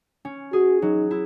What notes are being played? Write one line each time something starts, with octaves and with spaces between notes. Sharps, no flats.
C#4
F#4 G#4
F#3 D#4
E4